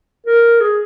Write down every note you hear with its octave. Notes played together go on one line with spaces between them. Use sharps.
A#4
G#4